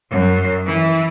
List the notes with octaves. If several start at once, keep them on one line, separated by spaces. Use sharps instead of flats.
F#2
E3